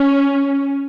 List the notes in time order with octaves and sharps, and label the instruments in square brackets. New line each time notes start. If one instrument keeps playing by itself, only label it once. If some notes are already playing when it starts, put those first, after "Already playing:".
Already playing: [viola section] C#4